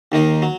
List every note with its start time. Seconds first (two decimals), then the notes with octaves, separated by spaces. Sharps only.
0.12 D#2 D#3 A#3 D#4
0.42 F#3